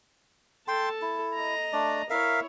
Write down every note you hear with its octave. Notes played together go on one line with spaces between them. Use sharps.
A4 G5 A5 C6
E4
D#5 A#5
A3 D4 D5
E4 A#4 C#5 E5 F5